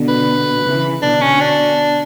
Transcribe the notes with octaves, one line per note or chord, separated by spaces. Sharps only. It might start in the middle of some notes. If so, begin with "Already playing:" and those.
Already playing: B2 D3
B4
C#3 E3
B2 D3 D4
C#4
D4